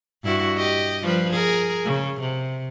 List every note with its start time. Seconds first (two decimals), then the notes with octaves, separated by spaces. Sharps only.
0.24 G2 E4 F#4
0.57 G4 D#5
1.03 F3 G3 B4
1.31 G#4 A#4
1.85 C#3
2.20 C3